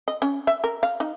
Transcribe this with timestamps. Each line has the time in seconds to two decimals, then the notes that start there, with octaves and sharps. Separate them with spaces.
0.08 D#5
0.22 C#4
0.47 E5
0.64 A#4
0.83 F5
1.00 D#4